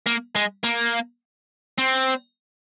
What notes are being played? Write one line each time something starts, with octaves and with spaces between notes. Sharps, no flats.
A#3
G#3
A#3
C4